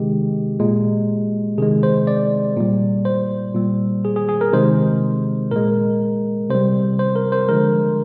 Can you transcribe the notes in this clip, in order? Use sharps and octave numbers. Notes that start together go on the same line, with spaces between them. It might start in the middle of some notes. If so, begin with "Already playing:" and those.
Already playing: C3 D#3 G#3 G4
A#2 G#3
C3 D#3 G#3 G#4
C5
D5
A#2 G3
C5
A#2 G3
G#4
G#4
G#4
A#4
C3 D#3 G#3 C5
A#2 G#3 A#4
C3 G3 C5
C5
A#4
C5
D3 F3 G#3 A#4